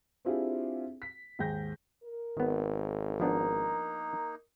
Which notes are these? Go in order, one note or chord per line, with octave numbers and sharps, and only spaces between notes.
C4 D4 E4 F4 G4 G#4
B6
D#2 G#2 G#4 G5 G6 A#6
A#4
G#1 D#3 B3
F3 A#3 B3 D4 D#4